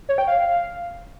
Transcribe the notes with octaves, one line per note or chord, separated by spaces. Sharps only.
C#5
G5
F5